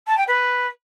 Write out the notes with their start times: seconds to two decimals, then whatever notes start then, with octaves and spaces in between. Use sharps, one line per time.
0.07 A5
0.17 G5
0.27 B4